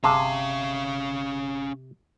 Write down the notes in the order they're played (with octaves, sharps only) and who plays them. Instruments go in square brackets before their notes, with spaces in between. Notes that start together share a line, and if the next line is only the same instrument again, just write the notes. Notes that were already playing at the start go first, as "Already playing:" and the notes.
[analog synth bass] G1 [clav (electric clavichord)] C3 [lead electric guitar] C#4 F5 [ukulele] G#4 A5 A#5